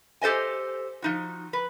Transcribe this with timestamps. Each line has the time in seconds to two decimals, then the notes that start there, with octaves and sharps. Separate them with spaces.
0.21 G4 A4 C5 D#5 G#5
1.02 F3 D#4 F#4
1.53 B4